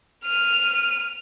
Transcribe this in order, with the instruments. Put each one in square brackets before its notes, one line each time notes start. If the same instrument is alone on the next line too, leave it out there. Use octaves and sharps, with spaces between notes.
[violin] F6 D#7